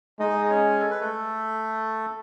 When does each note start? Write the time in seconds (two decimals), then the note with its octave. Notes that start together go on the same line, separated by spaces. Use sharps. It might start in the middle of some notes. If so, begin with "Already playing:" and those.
0.20 G#3 D#4 D#5
0.46 D#5
0.50 C#4 C#5
0.80 A4
0.91 B4
1.01 A3 A4